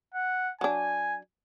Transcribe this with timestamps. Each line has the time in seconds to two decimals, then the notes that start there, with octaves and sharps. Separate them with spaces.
0.14 F#5
0.61 F#3 D4 G#5